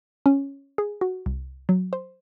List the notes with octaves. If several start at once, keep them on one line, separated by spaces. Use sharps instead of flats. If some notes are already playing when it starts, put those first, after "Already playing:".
C#4
G#4
F#4
C2
F#3
C5